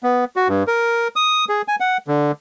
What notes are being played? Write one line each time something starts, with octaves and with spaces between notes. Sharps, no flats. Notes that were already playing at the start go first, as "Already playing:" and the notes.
B3
F#4
G2
A#4
D#6
G#4
G#5
F#5
D3